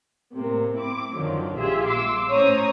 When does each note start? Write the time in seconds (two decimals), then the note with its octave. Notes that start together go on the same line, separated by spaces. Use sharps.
0.36 A2 C3 A#3
0.76 C4 E4 D6
1.15 F#2 D3 D#3 F3 F#3
1.55 A#1 F4 G4 G#4 E5
1.86 C6 D6 E6
2.29 A2 C#4 C5 C#5 A#5 D#6